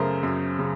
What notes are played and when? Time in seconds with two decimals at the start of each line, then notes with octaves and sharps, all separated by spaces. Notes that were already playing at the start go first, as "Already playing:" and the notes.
Already playing: F#2 C#3 A3 A#4 C5
0.23 F#2
0.59 C#3